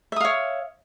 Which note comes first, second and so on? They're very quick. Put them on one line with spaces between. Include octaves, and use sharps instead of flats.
E5 D#6 F5 C#5